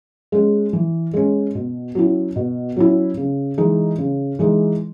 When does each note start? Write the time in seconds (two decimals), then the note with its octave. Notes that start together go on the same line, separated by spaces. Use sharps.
0.32 G#3 C#4
0.73 E3
1.14 G#3 C#4
1.55 B2
1.95 F#3 C#4 E4
2.36 B2
2.76 F#3 C#4 E4
3.17 C#3
3.58 E3 G#3 D#4
3.98 C#3
4.39 E3 G#3 D#4